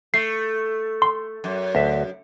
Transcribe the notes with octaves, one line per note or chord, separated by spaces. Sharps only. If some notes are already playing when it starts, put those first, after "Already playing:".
A3 C7
C6
F#2
D2 E5